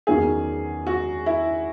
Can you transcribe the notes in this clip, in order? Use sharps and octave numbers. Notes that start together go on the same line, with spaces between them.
E2 D#3 F#3 C#4 G#4
F#4
E4